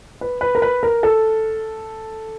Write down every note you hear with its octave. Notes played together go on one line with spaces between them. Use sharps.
B4
B4
A#4
B4
A#4
A4